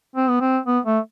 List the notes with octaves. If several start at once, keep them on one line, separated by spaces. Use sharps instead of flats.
C4
B3
C4
B3
A3